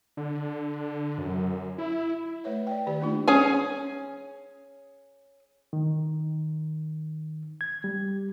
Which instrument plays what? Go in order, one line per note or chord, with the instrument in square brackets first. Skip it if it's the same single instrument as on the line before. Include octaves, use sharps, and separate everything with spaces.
[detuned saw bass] D3
F#2
E4
[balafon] A3 B4 C#5 E5
D5 G5
D#3 G4 D5
A3 A#3 D4 D#4 F4
[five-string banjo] C#4 G#4 G#5
[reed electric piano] D#3
G#6
G3